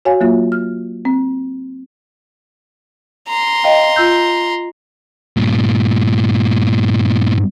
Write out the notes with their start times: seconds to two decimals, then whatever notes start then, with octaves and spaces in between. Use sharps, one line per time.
0.05 F#4 C#5 F5 G#5
0.21 F#3 A#3 F4
0.52 F6
1.05 C4
3.28 A#5 C6
3.64 D#5 F5 G5
3.96 F4 E6 G6
5.37 G2 A#2